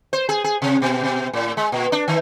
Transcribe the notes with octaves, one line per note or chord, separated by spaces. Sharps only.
C5
G#4
G#4
C3
B2
B2
A2
G#3
A#2
D4
D#3